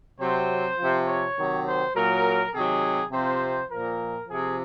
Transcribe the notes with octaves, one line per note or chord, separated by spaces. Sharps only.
C3 F#3 C5
C3 F3
C#5
C3 D#3 F#3
C5
A#2 F#3 A#4
C3 D#3 F#3 G#4
C3 F3 C5
A#2 F3 A#4
C3 F3 G#4